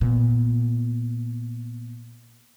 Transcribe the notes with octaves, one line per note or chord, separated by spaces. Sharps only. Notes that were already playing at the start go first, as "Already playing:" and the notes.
A#2 B3